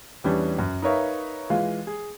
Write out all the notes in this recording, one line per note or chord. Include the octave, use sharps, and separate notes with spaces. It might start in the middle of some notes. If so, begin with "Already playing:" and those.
E2 E3 G3 C#4 D4
F#2
D#4 A#4 B4 C#5 E5 F5
E3 G#3 F4
G#4